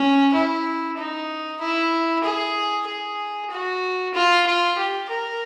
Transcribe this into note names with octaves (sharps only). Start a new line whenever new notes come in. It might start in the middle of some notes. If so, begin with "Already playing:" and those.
Already playing: C#4
E4
D#4
E4
G#4
G#4
F#4
F4
F4
G4
A#4